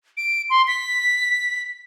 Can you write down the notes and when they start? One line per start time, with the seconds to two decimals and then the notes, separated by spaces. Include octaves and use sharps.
0.17 D7
0.50 C6
0.68 B6